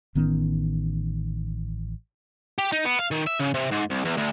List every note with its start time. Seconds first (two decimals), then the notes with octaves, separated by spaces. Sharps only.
0.15 A1 D#3 B3 C#4
2.58 G4
2.72 D#4
2.85 B3
2.99 F5
3.11 D#3
3.27 E5
3.39 C#3
3.54 C3
3.71 G#2
3.90 C2
4.05 E2
4.17 D2